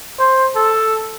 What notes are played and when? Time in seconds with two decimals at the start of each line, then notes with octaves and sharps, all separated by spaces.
0.19 C5
0.55 A4